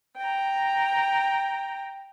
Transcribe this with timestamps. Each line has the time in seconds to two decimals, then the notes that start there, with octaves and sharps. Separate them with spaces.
0.17 G5 A#5